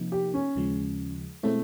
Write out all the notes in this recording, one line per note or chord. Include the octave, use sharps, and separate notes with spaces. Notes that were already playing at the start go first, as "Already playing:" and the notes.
Already playing: C3 F3 A#3 D#4
G4
C#4
D#2 C#3 F3 G#3
B2 G#3 A3 C4 E4